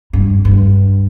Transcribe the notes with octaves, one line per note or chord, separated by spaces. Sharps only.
G2
G2